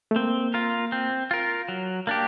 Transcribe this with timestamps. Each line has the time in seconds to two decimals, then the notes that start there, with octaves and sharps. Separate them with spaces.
0.11 A3
0.16 A#3 C4
0.54 F4 A#4
0.92 C4
1.31 F4 A#4
1.69 F#3
2.07 A#3 D4 G4